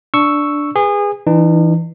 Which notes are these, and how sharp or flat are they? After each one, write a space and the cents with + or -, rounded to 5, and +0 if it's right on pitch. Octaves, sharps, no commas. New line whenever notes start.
D4 +0 C#6 +0 E6 +0
G#4 -25 B4 +0
E3 +0 D#4 -45